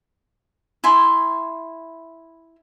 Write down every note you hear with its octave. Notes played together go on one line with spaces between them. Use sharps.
E4 G#5 C6